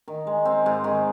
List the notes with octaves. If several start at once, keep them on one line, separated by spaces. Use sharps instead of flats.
D#3
G#3
C4
G#2
D#3